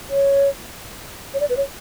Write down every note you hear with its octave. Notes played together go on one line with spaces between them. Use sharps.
C#5
C#5
D5
B4
C#5